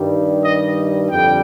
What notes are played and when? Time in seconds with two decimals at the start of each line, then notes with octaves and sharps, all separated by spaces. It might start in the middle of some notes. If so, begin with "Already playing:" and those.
Already playing: G2 D#3 G3
0.42 D#5
1.11 F2 D3 G3 G5